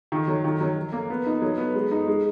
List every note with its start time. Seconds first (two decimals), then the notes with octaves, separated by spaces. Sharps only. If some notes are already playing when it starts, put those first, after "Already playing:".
0.12 D#3
0.28 F#3
0.44 D#3
0.61 F#3
0.76 F#3
0.92 A#3
1.10 B3
1.26 D#4
1.42 F#3
1.58 B3
1.74 G#3
1.91 D#4
2.08 G#3